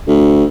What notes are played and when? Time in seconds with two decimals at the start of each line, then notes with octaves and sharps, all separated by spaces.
0.08 D2